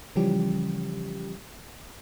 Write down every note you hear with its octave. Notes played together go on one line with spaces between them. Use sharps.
C#3 E3 F3 G3 C#4 G4